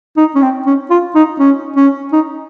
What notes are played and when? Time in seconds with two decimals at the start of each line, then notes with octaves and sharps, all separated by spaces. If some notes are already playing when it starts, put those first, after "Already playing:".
0.17 D#4
0.35 C#4
0.42 C4
0.66 C#4
0.90 F4
1.15 D#4
1.39 C#4
1.76 C#4
2.13 D#4